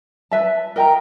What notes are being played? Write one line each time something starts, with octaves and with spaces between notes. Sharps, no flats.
B4 E5 A5
A#4 D#5 G5 A#5